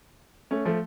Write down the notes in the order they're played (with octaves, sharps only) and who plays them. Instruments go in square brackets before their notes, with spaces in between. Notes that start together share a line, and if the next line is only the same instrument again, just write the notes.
[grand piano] A3 C#4
F3 A3